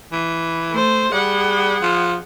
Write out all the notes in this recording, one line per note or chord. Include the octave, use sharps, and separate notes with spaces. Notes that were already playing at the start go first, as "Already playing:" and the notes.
E3
A3 C5
G3 G#4 F#5
F3